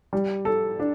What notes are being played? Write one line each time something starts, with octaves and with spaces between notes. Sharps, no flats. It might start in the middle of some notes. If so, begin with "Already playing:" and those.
G3
A4
D4